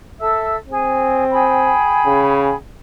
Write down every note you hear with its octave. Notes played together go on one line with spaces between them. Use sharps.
A4 E5 E6
C4 G#4
G#4 G5 B5
C#3